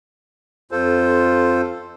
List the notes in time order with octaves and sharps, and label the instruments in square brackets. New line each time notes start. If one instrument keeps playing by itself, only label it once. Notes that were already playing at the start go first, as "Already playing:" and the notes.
[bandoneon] F2 F4 A4 C5